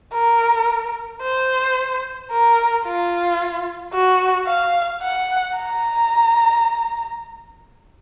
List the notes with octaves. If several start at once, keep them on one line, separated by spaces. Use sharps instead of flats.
A#4
C5
A#4
F4
F#4
F5
F#5
A#5